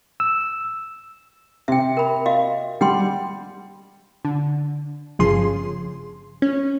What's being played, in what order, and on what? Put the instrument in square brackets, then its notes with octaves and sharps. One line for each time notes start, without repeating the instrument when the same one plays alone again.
[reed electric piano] E6
[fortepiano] C3 [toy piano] E5 G5
[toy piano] A#4 B5
F#4 D#5 F5
[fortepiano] G3 [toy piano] F#5 G5 C6
[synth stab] D3
G1 G2 C#3 F3 G#4 C6
C#4